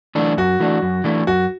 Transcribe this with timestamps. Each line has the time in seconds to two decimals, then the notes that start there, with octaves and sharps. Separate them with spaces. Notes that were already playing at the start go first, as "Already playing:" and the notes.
0.15 E3 A3 D4
0.37 F#2 F#4
0.60 E3 A3 D4
0.82 F#2
1.04 E3 A3 D4
1.27 F#2 F#4